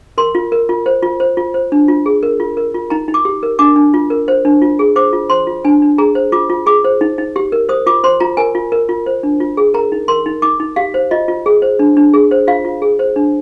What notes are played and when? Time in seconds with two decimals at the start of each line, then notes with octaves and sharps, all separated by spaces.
0.18 A#4 C6
0.35 F4
0.52 A#4
0.69 F4
0.86 C5
1.03 F4
1.20 C5
1.37 F4
1.54 C5
1.72 D4
1.88 F4
2.06 G#4
2.23 A#4
2.40 F4
2.57 A#4
2.74 F4
2.90 D#4 A#5
3.08 D#4
3.14 D6
3.25 G4
3.43 A#4
3.59 D4 D6
3.76 D4
3.94 F4
4.10 A#4
4.28 C5
4.45 D4
4.62 F4
4.79 G#4
4.96 C5 D6
5.13 F4
5.30 C5 C6
5.47 F4
5.65 D4 G#5
5.82 D4
5.98 G#4 A#5
6.15 C5
6.32 F4 D6
6.50 F4
6.66 G#4 D6
6.84 C5
7.01 D#4
7.18 D#4
7.36 G4
7.52 A#4
7.69 C5 D#6
7.86 F4 D6
8.04 C5 C6
8.20 F4 A#5
8.37 A#4 G#5
8.55 F4
8.72 A#4
8.89 F4
9.06 C5
9.23 D4
9.40 F4
9.57 G#4
9.74 A#4 A#5
9.92 D#4
10.08 A#4 C6
10.26 D#4
10.42 D#4 D6
10.60 D#4
10.76 G4 F5
10.94 C5
11.11 F4 D#5
11.28 F4
11.46 G#4
11.62 C5
11.79 D4
11.97 D4
12.13 G#4
12.31 C5
12.47 F4 F5
12.65 F4
12.82 G#4
12.99 C5
13.16 D4